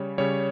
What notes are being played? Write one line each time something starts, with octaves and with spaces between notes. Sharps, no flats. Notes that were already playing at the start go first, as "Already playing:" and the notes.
Already playing: C#3 G3 C#5
C#3 G3 C#5